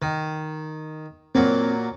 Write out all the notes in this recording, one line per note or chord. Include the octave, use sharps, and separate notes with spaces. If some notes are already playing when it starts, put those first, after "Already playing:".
D#3
A#2 F#3 A#3 C4